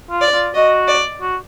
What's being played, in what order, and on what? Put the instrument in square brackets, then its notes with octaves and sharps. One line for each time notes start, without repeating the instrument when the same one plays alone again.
[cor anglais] F4
[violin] D5
[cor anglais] F4
[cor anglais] F#4 [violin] D#5
[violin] D5
[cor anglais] F#4